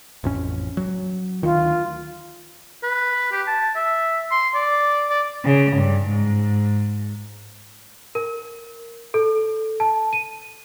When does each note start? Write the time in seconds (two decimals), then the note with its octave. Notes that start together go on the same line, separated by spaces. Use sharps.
0.24 A1 F2 C#4
0.77 F#3
1.43 D2 D#3 F4
2.83 B4
3.32 G4
3.48 A5
3.76 E5
4.31 C6
4.55 D5
5.10 D5
5.45 C#3
5.77 G2
6.07 G#2
8.15 A#4
9.14 A4
9.80 A5
10.13 D#7